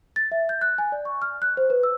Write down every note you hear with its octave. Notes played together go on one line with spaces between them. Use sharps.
A6
E5
G6
F#6
G#5
D5
C#6
F6
F#6
C5
B4
E6